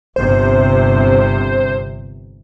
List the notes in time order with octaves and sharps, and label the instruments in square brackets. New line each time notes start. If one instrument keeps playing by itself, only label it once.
[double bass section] G1 C3 [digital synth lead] C5